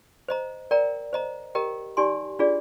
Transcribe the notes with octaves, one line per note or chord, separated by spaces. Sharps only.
C5 D#5 A#5
A#4 D5 G5 A#5
C5 D#5 A#5
G4 A#4 D#5 G5 A#5
D#4 G4 D5 G#5 C6
D4 F4 G#4 D5